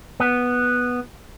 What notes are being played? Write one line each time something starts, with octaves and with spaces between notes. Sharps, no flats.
B3